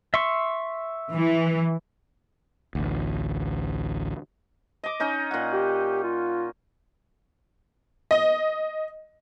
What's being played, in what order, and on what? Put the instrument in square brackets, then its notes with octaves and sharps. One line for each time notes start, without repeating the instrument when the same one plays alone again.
[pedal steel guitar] E5 C6 C#6
[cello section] E3
[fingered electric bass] A1 D2
[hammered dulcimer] D#5 D6
C#4 D#4 D#5
A#2 F#5
[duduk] G4
F4
[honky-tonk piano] D#5